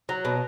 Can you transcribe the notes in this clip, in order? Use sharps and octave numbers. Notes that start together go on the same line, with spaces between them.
F#3
B2